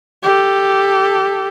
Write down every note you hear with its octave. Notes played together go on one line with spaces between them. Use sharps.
G4 A4